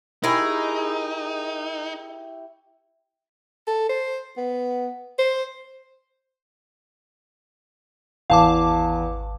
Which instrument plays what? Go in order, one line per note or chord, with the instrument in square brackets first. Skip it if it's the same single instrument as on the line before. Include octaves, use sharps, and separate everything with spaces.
[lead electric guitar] D#4 [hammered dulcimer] E4 G4 C#6 [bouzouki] G#4 A#4
[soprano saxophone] A4
C5
B3
C5
[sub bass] G#1 [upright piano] E2 [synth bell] F5 A5 D6